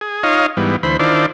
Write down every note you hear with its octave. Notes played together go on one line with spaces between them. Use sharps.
G#4
D#4 F4 C#5 D#5 F5
G#2 E3 G3 B3
D2 E3 C5 B5
D#3 D4 E4 F4 C5 D5